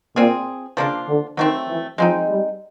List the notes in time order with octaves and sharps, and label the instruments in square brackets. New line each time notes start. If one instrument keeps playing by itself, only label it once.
[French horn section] A#2 [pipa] C4 F4 G#4
[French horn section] C#3 [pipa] F3 A#3 D4 F4
[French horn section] D3
[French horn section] D#3 [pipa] F#3 A3 C4
[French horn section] E3
[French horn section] F3 [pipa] G#3 C4 D#4
[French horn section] G3